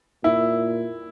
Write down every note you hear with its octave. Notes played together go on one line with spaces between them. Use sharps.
A#2 E4